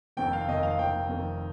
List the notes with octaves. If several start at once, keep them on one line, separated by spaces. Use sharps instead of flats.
F1 F2 D#3 C4 G5
F5
F1 F2 D#3 C4 D#5
F5
F1 F2 D#3 C4 G5
F1 F2 D#3 C4